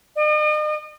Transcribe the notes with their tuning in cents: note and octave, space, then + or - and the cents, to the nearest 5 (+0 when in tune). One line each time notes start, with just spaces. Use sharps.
D#5 -40